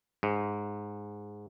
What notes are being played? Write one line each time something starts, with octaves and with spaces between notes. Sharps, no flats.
G#2